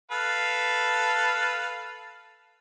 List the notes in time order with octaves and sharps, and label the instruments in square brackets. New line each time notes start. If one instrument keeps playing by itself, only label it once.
[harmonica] A4 B4 F5